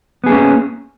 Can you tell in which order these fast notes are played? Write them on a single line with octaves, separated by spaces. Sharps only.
B3 G#4 A#3 C#4